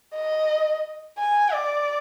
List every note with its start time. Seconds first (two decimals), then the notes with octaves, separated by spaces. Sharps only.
0.15 D#5
1.19 G#5
1.53 D5